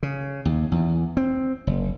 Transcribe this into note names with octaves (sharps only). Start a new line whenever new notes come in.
C#3
D#2
E2
C4
F#1